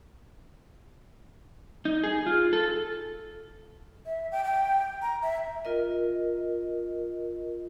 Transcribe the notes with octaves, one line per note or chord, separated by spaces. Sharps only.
D#4
G#4
F4
A4
E5
G5
G5
A#5
E5
F4 A#4 D#5